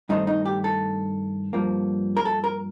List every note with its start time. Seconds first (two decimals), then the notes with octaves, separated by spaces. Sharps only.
0.09 G2 D#3 A3 C4 D#4
0.27 D#4
0.45 G4
0.64 A4
1.53 G2 F3 A#3
2.17 A#4
2.25 A4
2.44 A#4